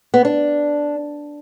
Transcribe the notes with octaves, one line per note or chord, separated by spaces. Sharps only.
B3
D4